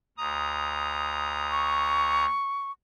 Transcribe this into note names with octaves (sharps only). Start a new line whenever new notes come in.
D2 A#5 D#6
C#6